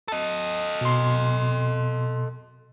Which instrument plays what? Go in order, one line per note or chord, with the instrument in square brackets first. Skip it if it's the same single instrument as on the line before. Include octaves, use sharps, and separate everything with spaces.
[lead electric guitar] A4 D#5
[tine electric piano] B2 C6